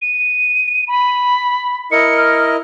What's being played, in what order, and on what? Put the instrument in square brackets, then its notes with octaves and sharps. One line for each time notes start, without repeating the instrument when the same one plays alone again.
[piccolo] D#7
B5
[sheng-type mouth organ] E4 A#4 D#5 [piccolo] C#7
[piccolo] F6